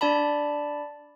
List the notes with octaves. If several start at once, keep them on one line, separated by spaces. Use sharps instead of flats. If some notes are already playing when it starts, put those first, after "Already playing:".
D4 D5 A5 B5